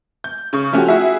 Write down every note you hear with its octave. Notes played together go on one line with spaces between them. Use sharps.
G6
C#3 C#6
F3 A3 C#4 F#4 G4
E4 F#4 G#4 E5